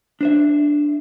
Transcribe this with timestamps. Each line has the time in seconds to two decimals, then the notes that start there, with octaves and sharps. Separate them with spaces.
0.21 D4 C5 E5